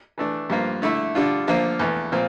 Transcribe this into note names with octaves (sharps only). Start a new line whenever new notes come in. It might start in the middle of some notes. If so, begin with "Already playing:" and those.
E3 A3 D4
G2 F3 A#3 F4
D3 A3 E4
D3 G3 D4 F4
D3 F3 A#3 F4
E2 E3 A3
A#2 F3 C4